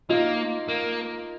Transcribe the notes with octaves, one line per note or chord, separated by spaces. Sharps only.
A#3 D#4 F4
A#3